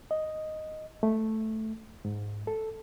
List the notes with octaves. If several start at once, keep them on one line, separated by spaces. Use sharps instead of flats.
D#5
A3
G#2
A4